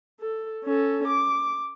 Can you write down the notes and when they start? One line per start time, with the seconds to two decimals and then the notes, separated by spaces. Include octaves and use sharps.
0.20 A4
0.64 C#4 A4
1.08 D6